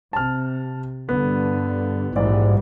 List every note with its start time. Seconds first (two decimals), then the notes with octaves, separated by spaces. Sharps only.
0.13 C3 A5 F6
1.09 G2 D3 B3
2.16 A#1 G#2 E3 G3 D5